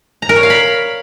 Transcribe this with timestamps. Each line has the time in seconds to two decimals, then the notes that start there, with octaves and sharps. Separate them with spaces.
0.22 A#5
0.29 A#4
0.36 C#5
0.43 F5
0.50 B5